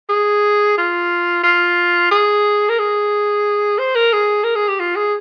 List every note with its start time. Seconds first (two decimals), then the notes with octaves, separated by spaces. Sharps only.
0.09 G#4
0.78 F4
1.44 F4
2.11 G#4
2.69 A#4
2.79 G#4
3.79 C5
3.95 A#4
4.13 G#4
4.44 A#4
4.55 G#4
4.68 G4
4.80 F4
4.96 G#4